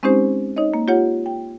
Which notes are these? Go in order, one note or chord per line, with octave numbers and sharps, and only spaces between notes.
G#3 C4 C#4 D#4 G4 C5
D#4 C#5 D#5
A#3
F4 G4 C#5 F#5
G5